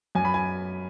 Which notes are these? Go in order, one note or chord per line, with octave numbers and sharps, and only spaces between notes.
F#2 G#5
B5
G#5